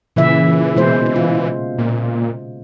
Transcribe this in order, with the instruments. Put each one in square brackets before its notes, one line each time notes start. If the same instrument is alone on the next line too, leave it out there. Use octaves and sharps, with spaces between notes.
[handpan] A#2 C#3 E5 [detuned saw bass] E3
[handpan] B2 G#3 C5
F4
[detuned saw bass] A#2